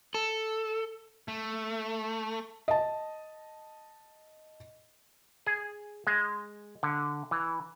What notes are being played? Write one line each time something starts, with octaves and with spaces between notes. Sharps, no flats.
A4
A3
D#5 A5
G#4
G#3
D3
E3